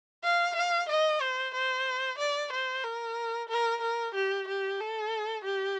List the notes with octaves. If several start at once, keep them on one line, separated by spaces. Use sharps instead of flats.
F5
F5
D#5
C5
C5
D5
C5
A#4
A#4
A#4
G4
G4
A4
G4